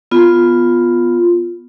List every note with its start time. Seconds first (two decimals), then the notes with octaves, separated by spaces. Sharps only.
0.11 B3 F4